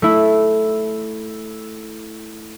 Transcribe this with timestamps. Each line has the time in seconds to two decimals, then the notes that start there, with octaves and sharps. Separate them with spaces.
0.02 A3 E4